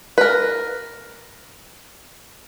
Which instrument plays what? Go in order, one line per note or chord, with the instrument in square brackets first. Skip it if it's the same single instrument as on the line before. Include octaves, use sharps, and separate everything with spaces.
[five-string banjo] A#4 B4